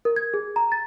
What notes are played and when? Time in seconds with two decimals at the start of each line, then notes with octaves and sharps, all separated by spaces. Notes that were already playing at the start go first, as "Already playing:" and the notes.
0.05 A#4
0.16 G#6
0.34 G#4
0.56 A#5
0.72 A6